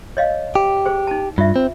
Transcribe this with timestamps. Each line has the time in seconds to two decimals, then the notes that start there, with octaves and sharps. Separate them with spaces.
0.17 C#5 D#5 F5
0.55 G4
0.86 G#4 C5
1.07 D#4 A5
1.38 G2 F4 E5
1.56 C4